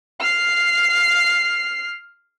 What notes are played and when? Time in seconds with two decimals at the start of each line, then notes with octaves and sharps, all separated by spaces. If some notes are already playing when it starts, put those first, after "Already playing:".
0.20 F6 C7